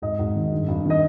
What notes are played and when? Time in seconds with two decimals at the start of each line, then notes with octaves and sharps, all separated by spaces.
0.02 G#2 D#5
0.19 G#2
0.36 D#3
0.52 G2
0.68 G2
0.85 D#3 D#5